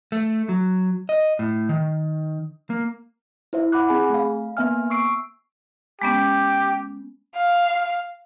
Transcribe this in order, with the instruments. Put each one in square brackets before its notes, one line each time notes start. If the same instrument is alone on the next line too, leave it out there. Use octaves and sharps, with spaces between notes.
[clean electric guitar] A3
F#3
D#5
A2
D#3
A#3
[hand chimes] E4 C5 E5
F#5 B5 D6 F#6
C4 G#4 G#5 B5
A3 F5
A#3 B3 E5 G#5 F6
C#6 E6 C7 D7
[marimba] G#3 B3 C#4 [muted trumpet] G4
[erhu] F5